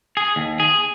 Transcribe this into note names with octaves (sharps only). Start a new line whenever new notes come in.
G#4
D#2
G#4